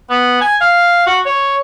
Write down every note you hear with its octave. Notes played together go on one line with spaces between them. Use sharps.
B3
G#5
F5
F#4
C#5